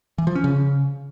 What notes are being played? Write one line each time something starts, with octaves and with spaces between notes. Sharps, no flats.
E3
F3
C#4
C#3